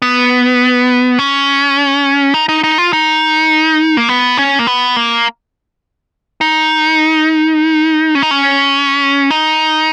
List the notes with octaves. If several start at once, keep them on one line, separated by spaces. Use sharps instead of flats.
B3
C#4
D#4
D#4
D#4
F4
D#4
A#3
B3
C#4
A#3
B3
A#3
D#4
C#4
D#4
C#4
D#4